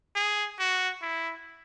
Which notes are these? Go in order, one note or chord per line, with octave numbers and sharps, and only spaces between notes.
G#4
F#4
E4